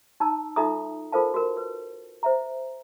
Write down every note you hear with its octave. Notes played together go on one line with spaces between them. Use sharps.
D#4 A5 A#5 E6
D#4 F4 A4 E5 A#5 D#6
F4 A4 A#4 C5 F5 A5
F#4 A#4
B4
C5 E5 A#5